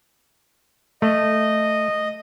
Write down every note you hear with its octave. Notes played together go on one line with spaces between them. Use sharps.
A3 D#5